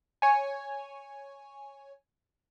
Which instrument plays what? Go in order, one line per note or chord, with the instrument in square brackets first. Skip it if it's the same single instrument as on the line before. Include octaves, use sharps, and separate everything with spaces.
[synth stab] C#5 G#5